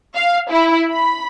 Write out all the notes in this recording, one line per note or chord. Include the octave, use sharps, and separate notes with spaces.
F5
E4
B5